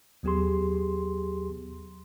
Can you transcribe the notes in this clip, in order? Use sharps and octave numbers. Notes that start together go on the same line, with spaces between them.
D#2 F#3 B3 G4 G#4 C6